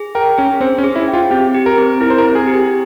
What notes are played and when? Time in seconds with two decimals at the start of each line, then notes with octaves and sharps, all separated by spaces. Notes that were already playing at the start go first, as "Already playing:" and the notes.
Already playing: G#4
0.15 A#4 G5
0.38 C#4 G#4
0.61 C4 C5
0.78 C#4
0.84 G#4
0.96 E4
1.08 G5
1.14 F4
1.31 C4 G4
1.54 G4
1.66 A#4
1.78 C4
2.01 E4 A#4
2.10 C5
2.18 A#4
2.24 C4
2.35 G#4
2.47 G4